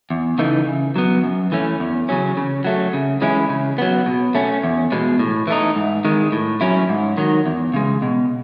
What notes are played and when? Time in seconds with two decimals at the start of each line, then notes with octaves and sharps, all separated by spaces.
0.10 E2
0.38 C#3 E3 A3 D#4
0.67 C#3
0.96 F#3 B3
1.24 F#2
1.52 E3 A3 C#4
1.80 E2
2.09 C#3 F#3 C#4
2.37 C#3
2.65 F#3 A3
2.94 C#3
3.22 E3 G#3 C#4 E4
3.50 C#3
3.78 F#3 B3
4.06 B2
4.35 A3 C#4
4.64 E2
4.92 B2 G#3
5.19 A2
5.47 E3 A3 D#4
5.76 G#2
6.05 D#3 G#3
6.32 A2
6.61 F#3 C#4 E4
6.89 G#2
7.17 D#3 F#3
7.46 E2
7.74 C#3 G#3
8.02 B2